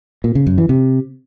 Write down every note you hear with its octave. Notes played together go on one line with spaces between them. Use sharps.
A#2
C#3
F#2
E3
C3